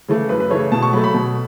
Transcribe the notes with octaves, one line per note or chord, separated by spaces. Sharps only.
C#3 E3 A3
F#2 B4
B4
C#3 E3 A3 C#5
B2 A5
C#6
F#3 A3 B5
B5
B2